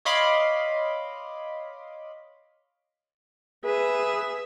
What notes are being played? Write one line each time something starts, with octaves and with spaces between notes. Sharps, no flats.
C#5 D#5 F5 B5 C6 D6
G#4 B4 E5